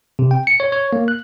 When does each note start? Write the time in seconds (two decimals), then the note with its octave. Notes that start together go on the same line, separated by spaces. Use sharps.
0.19 C3
0.31 G5
0.47 C#7
0.60 C#5
0.72 C#5
0.93 A#3
1.08 F#6